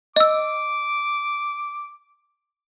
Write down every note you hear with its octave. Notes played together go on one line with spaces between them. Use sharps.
D#5 D6 E6